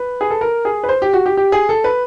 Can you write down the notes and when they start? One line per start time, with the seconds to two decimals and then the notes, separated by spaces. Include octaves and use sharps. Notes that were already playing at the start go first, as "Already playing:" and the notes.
Already playing: B4
0.21 G#4
0.30 A4
0.41 A#4
0.65 G#4
0.83 B4
0.89 C5
1.02 G4
1.13 F#4
1.26 G4
1.37 G4
1.52 G#4
1.69 A4
1.84 B4